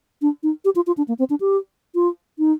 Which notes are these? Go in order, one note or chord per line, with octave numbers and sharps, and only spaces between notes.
D4
D#4
G4
F4
F4
D4
A#3
C4
D4
G4
F4
D#4